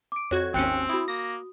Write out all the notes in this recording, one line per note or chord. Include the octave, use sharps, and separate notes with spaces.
D6 D7
F2 F#4 C#5 F#6 G#6
G#1 D#2 C4 C#4 G5 F#6 C#7
E4 F#4 D#6
A#3 A#6